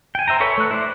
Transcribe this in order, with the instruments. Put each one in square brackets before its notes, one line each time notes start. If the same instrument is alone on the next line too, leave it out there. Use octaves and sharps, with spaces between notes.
[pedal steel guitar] G5 G#5
C5 E5 G5 A#5
A4 B4 C#5 E5 B5
A3 F#6
E4 C5 D5